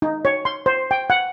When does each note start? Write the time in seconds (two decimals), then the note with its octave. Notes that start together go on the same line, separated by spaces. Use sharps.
0.02 D#4
0.25 C#5
0.45 C6
0.66 C5
0.91 G5
1.10 F#5